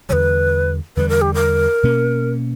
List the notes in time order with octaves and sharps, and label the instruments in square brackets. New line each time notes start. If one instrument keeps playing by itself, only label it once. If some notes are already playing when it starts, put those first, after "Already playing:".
[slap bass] E2 D3 G3 [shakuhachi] B4 C#5
[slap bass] E2 D3 G3 [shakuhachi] B4
[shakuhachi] A#4
G4
A#4
[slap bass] B2 A#3 C#4